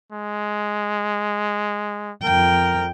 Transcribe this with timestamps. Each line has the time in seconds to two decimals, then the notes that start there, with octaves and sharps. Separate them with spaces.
0.12 G#3
2.24 F2 A#4 G5